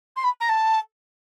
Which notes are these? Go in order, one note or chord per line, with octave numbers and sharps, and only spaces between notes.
C6
B5
A#5
A5